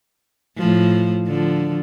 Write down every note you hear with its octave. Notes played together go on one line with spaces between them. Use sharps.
A2 F3
D3 F3